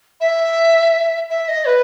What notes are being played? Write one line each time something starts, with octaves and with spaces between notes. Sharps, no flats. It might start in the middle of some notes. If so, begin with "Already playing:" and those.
E5
E5
D#5
B4